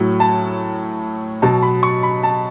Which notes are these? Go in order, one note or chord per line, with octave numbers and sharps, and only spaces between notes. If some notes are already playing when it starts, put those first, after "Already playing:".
Already playing: A2 F#3
A5
B2 F#3 A5
B5
C#6
B5
A5